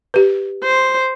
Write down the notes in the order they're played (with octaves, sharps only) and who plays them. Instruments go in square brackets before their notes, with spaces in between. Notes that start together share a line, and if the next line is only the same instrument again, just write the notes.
[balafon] G4 B4
[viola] C5